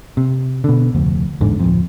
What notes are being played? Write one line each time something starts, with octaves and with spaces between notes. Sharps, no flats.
C3
B2 D3
F1 D2
A1 E2 G#2 D3
D1 F2